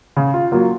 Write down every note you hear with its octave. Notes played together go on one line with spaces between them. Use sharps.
C#3
F4
F#3 A#3 F4